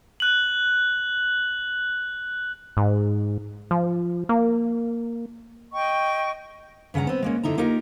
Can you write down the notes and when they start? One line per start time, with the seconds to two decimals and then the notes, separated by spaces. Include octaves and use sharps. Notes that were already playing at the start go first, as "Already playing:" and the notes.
0.20 F#6 F#7
2.77 G#2
3.71 F3
4.29 A#3
5.73 D#5 G5 C#6
6.94 G2 C#3 C#4 F#5 A#5
7.07 B3 C4
7.22 G#3 A#3 C#4
7.43 G2 D3 D#4 E4 A#5
7.58 A#3 D#4 F4 G4 A#4